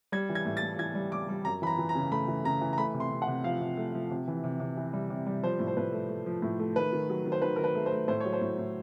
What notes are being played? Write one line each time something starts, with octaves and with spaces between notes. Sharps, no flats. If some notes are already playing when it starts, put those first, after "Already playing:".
G3 G#6
E3
G#6
A2
A6
A2
E3 G#6
G3
G3 D6
G3
F#2 A#5
E3 A#5 B5
E3
A#5
C#3
A3 B5
E3
C#3 A#5
E3
A#5
A3 B5
C3
C6
C3
F#5
C3
F3 F5
C3
A3
F3
C3
E3
C3
C3
E3
G3
C3
G3
F3 C5
A2
C5
A2 B4
A3
A3
F3
A2
A3
D#3 B4
D#3
F#3
D#3
C5
D#3 B4
D#3 A#4
B4
A3
C5
A3
A2 C5
F#3 C#5
C5
A2
A2